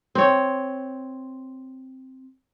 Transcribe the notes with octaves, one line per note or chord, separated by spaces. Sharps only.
C4 C#5